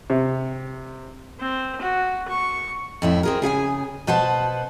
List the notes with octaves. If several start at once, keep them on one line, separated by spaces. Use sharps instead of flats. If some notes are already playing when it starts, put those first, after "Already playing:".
C3
C4
F#4
C#6
F2 A2 E4
C4 G#4 A#4
C#3 G#4 F5 G#5
B2 B4 C5 F#5 A5